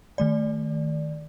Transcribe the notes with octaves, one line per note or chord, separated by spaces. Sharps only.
D#3 A3 D5